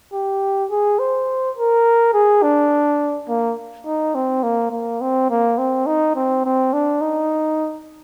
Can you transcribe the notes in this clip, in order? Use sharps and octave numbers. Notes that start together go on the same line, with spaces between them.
G4
G#4
C5
A#4
G#4
D4
A#3
D#4
C4
A#3
A#3
C4
A#3
C4
D#4
C4
C4
D4
D#4